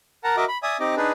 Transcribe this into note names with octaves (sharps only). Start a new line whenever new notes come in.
A#4 F#5 A5 A#5
F#4 A#4 D#5 E5 D6
B5
D5 E5 G#5 D#6
C4 D#4 G4 D#5 D6
D4 D#4 G#4 B4